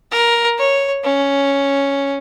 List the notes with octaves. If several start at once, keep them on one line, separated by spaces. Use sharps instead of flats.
A#4
C#5
C#4